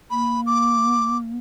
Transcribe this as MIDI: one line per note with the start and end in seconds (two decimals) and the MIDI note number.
0.11 1.38 58
0.11 0.41 83
0.47 1.17 86